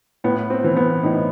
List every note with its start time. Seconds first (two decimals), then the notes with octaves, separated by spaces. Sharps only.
0.24 A2 B3
0.50 C4
0.64 E3
0.77 B3
1.03 A2 D#4